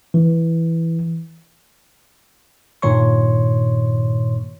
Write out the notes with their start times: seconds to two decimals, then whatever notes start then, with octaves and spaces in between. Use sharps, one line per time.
0.14 E3
2.82 G2 A#2 D#3 C#5 C6 C#6